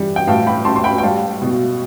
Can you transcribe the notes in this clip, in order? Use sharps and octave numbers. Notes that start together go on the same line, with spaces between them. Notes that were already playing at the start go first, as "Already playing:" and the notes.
Already playing: E3 G3
G5
A2 F5 A5
G5 B5
A2 A5 C6
C6
G5 B5
G5
G3 F5 A5
B2